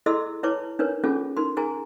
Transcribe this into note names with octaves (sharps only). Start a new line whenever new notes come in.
E4 G#4 A4 D#5 C6 E6
E4 B4 C#5 A5 D6
D4 D#4 A#4 B4 C#5
C#4 D4 F4 G#4 A4
D#4 A#4 C6
G#4 A#4 G#5 A#5